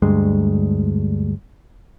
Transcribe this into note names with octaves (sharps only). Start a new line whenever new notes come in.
D2 G2 G#3